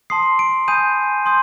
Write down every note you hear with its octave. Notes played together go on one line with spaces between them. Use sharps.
A5 C6 D#6 C7
D7
G#5 B5 D#6 G6 D#7
C6 D#6 G6